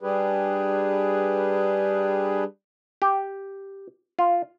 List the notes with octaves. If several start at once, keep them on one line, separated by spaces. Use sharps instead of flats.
G3 D4 G4 G#4 B4
G4
F4